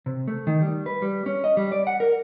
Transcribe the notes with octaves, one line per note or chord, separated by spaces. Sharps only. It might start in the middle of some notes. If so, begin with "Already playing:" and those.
C3
A3
D#3
G3
B4
G3
C#4
D#5
G3
D5
F#5
A#4